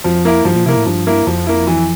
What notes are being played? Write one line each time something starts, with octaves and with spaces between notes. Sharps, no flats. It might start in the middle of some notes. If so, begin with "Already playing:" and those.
F2 F3
A#3 E4
G2 F3
A#2
C3 A#3 E4
A2
G2 F3
A#3 E4
F2 F3
A#3 E4
E3